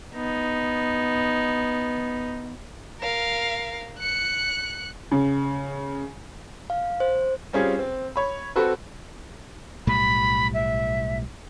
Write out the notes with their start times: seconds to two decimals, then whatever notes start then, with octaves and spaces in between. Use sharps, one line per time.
0.15 B3 D#4
3.01 A#4 F5
3.99 F#6 C#7
5.11 C#3
6.70 F5
7.00 C5
7.53 G3 C4 C#4 F4 G#4
7.79 C4
8.16 C#5 B5
8.56 C4 F#4 A4 B4
9.87 B1 A2 G3 B5
10.54 E5